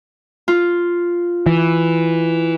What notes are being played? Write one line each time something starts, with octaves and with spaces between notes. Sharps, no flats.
F4
E3